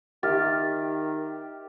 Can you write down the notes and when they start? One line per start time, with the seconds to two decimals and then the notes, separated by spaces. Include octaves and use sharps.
0.23 D#3 G4 E5 F6 A6